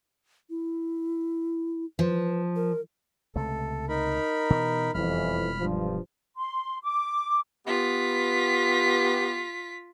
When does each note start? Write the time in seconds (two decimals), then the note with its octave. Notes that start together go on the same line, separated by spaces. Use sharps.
0.50 E4
1.99 F3 B4
2.56 A#4
3.36 C#2 C3 A3 A4
3.89 D#4 A#4 B5
4.50 B2 E3
4.94 E1 F2 E3 G3 B5 F6
5.60 G2 F3
6.37 C6
6.83 D6
7.67 B3 F4 G4 B6